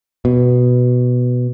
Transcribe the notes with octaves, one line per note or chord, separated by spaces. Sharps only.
B2